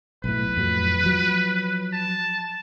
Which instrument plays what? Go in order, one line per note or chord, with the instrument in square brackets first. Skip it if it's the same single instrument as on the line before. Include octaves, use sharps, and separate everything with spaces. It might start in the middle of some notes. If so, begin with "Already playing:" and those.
[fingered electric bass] B1 A2 [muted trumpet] B4
[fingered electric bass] F2 A2 F#3
F3 F#3
[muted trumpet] A5